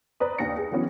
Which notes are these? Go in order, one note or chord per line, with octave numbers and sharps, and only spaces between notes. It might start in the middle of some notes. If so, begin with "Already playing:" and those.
B4 C5 D5 A#5 D#6
D#2 D4 A#6 C#7
G#4
D3 E3 F#3 B3 C#4